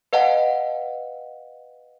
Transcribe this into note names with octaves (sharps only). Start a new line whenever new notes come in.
B4 D#5 F5 F#5 A5